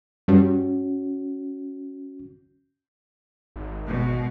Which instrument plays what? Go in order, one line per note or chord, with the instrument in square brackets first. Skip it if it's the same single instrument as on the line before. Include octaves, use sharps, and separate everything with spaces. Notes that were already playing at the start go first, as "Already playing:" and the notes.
[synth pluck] G2 [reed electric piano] C#4 F#4
[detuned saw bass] G#1
[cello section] B2 G#3